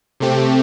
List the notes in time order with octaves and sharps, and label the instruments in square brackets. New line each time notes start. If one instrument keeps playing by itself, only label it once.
[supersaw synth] C3 A3 C4 G4